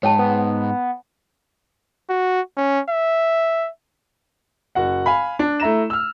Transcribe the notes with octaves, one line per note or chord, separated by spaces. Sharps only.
G#2 C#5 G5 A5
B3
F#4
C#4
E5
F#1 F#4 F#5
F5 G#5 B5
D4
A3 E4 A#5 E7
E6 F6